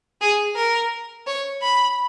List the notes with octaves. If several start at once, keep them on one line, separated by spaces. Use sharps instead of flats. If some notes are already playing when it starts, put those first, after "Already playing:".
G#4
A#4
C#5
B5